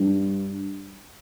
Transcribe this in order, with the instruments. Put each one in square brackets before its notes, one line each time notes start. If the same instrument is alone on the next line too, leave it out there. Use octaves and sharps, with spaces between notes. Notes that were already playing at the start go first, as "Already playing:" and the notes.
Already playing: [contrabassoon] G2